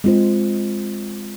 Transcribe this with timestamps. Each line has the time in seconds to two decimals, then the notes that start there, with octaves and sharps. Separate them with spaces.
0.04 G#3 C4 F4 C5